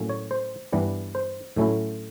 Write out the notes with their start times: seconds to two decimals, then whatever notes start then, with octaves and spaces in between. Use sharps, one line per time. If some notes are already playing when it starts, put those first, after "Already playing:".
Already playing: A2 F#3 A#3 C#4
0.09 C#5
0.31 C5
0.73 G2 E3 G3 B3 D4
1.15 C5
1.56 A2 F#3 A3 C#4 E4